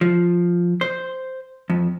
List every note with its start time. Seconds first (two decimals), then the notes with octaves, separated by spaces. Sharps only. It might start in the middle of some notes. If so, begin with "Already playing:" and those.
0.01 F3
0.81 C5
1.70 F2